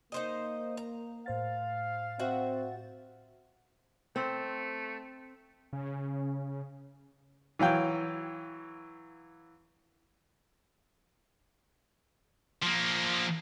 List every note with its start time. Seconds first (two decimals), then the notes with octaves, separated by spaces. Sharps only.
0.12 A#3 D#4 C5 D#5
0.77 A#5
1.26 A2 C5 F5 A6
2.19 C4 F#4 E5 F#5
4.16 A3 C4
5.73 C#3
7.59 E3 F#3 F5 G5
12.62 F3 A#3